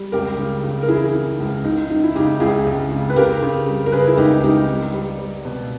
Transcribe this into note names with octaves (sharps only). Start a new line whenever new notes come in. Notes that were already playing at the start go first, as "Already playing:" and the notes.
Already playing: G3
C#2 G4 A#4
C#3
C#3
A#4
E3 E4 G#4
E3
C#2
C#2 D#4
C#2 D#4
E4
C#3 D#4 G4
C#2 E4 G#4
C#2
C#3
B4
C#3 G4 A#4
C#3
G3
A#4
C#3 G#4 B4
E4
C#2 D#4 G4
C#2 D#4 G4
G3
G3
G3
B2